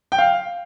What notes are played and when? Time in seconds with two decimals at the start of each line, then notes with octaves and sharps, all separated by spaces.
0.12 G5
0.18 F5